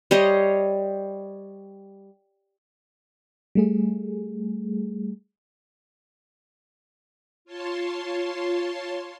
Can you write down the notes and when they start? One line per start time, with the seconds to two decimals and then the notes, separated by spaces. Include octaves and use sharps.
0.11 G3 C5 C#5 D#5
3.55 G3 A3 G#4
7.45 F4 C#5 A5 C6